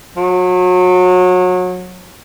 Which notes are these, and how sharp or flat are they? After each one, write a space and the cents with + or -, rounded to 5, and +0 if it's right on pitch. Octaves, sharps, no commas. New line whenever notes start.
F#3 -30